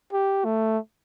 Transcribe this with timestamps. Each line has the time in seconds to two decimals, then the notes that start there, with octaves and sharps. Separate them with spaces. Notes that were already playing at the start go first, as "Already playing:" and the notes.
0.13 G4
0.45 A3